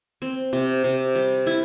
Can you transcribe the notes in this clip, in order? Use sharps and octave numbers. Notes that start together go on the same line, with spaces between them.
C4
C3
C3
G3
E4